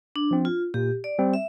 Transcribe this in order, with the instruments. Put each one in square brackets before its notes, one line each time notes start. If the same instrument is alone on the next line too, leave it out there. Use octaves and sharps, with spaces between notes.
[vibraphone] D4
[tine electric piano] F3 C4
[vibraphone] F4
[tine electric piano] A#2 [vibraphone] G4
[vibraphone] D5
[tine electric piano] G3 C4
[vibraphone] E5